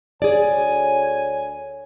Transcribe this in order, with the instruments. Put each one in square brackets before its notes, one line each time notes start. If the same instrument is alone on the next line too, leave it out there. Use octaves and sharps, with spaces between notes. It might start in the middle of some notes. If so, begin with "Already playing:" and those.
[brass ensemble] D2 C#5 G#5 [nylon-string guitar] G#4 D5